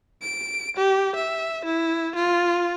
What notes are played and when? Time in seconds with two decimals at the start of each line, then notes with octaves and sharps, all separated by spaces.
0.22 D7
0.77 G4
1.15 E5
1.65 E4
2.15 F4